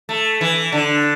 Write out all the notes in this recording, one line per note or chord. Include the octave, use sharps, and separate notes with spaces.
A3
E3
D3